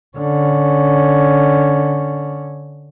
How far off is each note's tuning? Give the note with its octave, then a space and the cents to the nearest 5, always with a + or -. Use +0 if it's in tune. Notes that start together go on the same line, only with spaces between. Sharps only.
D3 +0 C#4 +0